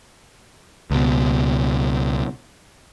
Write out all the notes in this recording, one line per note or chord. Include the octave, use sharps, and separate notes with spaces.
C#2 B2